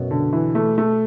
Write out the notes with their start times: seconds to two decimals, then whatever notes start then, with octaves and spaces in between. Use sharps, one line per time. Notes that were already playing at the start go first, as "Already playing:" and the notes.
Already playing: F#2 B2
0.11 D3
0.33 E3
0.55 A3
0.78 A3